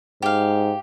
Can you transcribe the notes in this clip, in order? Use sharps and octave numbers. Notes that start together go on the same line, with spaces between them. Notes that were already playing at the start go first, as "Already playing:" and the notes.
G#2 G4 F5